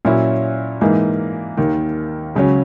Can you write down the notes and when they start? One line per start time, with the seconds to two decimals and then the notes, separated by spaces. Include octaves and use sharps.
0.05 A#2 F#3 C#4 E4
0.81 G#2 E3 A#3 D#4
1.57 D#2 D#3 A#3
2.35 C#2 C#3 F#3 C#4